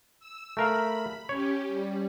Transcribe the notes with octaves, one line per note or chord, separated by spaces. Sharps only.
E6
A3 A#4 F5 B5
C#4 G4 C#5
G3